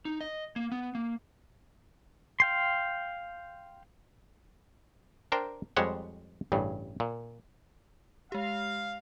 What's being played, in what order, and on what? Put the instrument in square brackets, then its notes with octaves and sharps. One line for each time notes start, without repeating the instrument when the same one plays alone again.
[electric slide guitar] D#4
D#5
A#3
B3
A#3
[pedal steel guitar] F5 G5 C6
[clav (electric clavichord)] D4 A#4 C5 G5
F2 G3 G#3 C5 C#5 F#5
A1 G2 C#3
A#2
[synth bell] G#3 G4 [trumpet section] F5